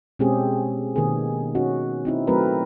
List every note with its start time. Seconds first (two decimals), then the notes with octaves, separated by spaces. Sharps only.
0.19 B2 G#3 C4 C#4 G4 G#4
0.96 B2 D#3 A#3 B3 G#4
1.55 C#4 D#4 F#4
2.05 C4 D#4 E4
2.27 F#3 A3 C4 A#4 B4